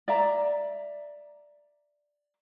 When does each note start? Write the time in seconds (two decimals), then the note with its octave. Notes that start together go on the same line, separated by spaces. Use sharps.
0.08 D5 E5 A#5